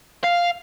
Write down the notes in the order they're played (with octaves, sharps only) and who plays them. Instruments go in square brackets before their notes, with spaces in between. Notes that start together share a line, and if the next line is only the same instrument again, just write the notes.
[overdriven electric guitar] F5